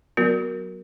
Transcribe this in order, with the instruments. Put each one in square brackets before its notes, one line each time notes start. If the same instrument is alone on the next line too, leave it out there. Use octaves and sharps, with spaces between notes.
[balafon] F#3 B3 F#4 A#4